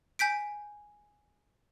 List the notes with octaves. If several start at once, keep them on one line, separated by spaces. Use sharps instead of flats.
G#5 G6 B6 D7